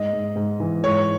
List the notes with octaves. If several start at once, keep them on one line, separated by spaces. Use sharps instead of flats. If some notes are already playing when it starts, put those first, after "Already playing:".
Already playing: G#2 D#5
G#2
G#2
E3
G#2 C#5